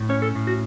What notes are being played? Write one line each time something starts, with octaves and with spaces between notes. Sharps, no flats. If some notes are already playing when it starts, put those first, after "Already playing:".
Already playing: A2
C#4 C#5
A4
A2
F#4